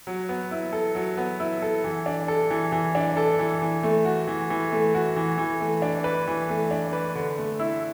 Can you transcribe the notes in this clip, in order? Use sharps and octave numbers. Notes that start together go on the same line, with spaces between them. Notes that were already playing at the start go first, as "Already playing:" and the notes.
F#3
B3
E4
A4
F#3
B3
E4
A4
E3
D4
A4
E3
E3
D4
A4
E3
E3
A3
F#4
E3
E3
A3
F#4
E3
E3
A3
D4
B4
E3
A3
D4
B4
D3
A3
E4